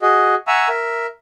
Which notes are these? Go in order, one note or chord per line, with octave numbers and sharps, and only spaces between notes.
F#4 G#4 D#5
E5 F#5 G#5 A#5 C#6 E6
A#4 E5